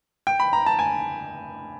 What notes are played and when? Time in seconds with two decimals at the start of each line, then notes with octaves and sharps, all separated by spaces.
0.27 G5
0.40 B5
0.53 A#5
0.66 A5
0.79 G#5